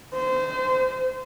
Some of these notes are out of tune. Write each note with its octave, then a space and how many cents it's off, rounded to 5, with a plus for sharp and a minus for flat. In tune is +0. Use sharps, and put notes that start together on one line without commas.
C5 -25